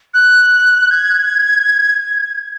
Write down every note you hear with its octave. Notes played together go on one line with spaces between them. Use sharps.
F#6
G#6